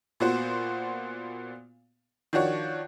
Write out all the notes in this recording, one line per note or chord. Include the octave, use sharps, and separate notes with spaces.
A#2 B3 F#4 C5
D#3 F3 D4 F#4 C#5